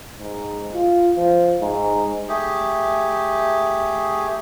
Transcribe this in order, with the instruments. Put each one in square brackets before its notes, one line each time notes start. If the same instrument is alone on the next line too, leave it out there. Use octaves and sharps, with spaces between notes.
[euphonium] G#2
F4
F3
G#2
[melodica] A3 G4 G#4